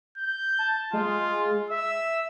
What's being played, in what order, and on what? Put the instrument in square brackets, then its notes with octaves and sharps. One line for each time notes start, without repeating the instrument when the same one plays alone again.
[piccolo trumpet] G6
[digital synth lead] A5
[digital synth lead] G#3 [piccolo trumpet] F4
[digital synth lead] E5 [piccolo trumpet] E6